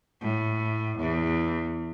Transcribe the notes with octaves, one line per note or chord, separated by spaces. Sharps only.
A2
E2